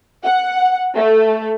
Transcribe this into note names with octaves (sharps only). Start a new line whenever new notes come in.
F#5
A3